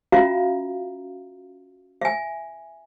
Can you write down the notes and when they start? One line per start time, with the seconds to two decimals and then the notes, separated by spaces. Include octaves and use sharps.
0.12 C#4 F4 F#4 E5 F5 A#5
2.01 E5 G#5